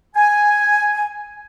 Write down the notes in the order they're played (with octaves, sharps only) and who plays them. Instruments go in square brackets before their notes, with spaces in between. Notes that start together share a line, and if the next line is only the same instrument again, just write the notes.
[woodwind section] G#5